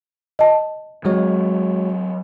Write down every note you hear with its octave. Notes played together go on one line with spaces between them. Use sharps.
D#5 A5
F#3 G#3 C4 F#4 C#5